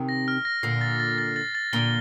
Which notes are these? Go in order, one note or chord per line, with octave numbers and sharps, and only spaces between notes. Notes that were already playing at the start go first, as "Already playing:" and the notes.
Already playing: C3 D#3
A#6
F6
A#6
A#2 D3 C7
A6
A6
A6
A6
A6
A#2 D3 G7